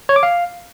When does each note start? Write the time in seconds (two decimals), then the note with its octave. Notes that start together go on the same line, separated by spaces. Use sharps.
0.09 C#5
0.16 D6
0.23 F5